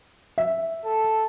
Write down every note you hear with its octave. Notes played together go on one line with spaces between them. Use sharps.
E5
A4